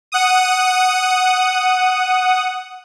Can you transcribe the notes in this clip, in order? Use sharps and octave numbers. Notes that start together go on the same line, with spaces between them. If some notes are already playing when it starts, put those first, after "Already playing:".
F#5 D#6